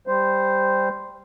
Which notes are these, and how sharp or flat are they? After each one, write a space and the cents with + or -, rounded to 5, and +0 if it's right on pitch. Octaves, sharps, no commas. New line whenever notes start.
G3 +5 C5 -5